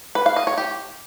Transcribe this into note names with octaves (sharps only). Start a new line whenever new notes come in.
B4
F5
D#5
C#5
G4